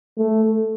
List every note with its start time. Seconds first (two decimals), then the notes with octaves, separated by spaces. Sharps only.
0.18 A3